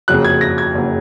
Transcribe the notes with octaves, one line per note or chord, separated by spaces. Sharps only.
F#1 F2 C#3 F#3 F#6
G#6
A#6
G#6
F#1 C#3 F#3